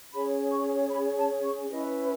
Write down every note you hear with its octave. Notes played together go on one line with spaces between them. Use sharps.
C#4 G#4 C#5 B5
C#6
B5
A5
C#6
C#4 E4 B4 D#5